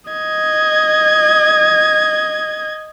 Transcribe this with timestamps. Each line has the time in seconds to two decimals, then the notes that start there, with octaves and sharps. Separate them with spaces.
0.11 D#5 G#6